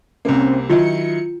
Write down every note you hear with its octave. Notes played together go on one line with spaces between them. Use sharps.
C2 C3 A#3 C4 C#4
D#3 F#3 E4 F4 C#7